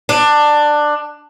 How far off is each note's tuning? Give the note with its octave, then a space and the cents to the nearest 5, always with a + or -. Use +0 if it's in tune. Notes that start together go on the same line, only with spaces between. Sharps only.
D4 +15